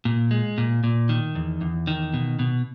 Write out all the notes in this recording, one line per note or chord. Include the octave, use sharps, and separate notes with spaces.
A#2
G#3
A#2
A#2
D#3
E2
E2
D#3
B2
B2